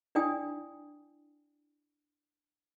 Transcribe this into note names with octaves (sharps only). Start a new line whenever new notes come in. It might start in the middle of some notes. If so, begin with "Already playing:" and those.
D4 E4 D5 G5 G#5 D#6